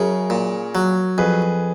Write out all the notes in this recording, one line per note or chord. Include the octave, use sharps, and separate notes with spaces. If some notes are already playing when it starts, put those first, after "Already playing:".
Already playing: F#2 C#3 A#4 C#5
A#2
F#3
F2 G#4 B4